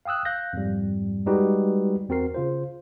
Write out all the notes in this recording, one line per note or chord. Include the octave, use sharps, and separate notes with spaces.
F5 G5 D#6 E6 F#6
F5 F#6 G6 A#6
F2 G#2 G3
G3 G#3 D#4 F#4 G4 B4
E2 C4 F#4 A#4 C7
C#3 F4 C5